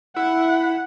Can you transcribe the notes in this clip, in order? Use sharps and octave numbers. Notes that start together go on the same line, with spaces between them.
E4 F#5